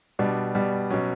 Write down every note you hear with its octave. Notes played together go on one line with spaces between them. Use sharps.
B2 G3 D4
B2 G3
B2 F#3 C#4